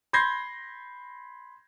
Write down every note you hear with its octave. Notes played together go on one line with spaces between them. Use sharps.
B5 C6 G6 G#6 A#6 C7